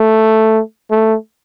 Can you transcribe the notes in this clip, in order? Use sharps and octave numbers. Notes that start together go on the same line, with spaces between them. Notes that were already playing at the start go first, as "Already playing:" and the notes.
Already playing: A3
A3